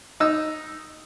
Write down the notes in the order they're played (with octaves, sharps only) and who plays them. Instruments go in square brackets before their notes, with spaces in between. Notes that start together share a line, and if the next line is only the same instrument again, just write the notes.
[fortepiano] D#4 E6